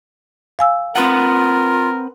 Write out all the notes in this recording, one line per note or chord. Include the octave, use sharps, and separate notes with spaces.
F5 G#5 E6
C4 F4 A#4 B4 F#5